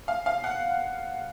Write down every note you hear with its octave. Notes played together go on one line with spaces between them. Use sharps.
F5
F5
F#5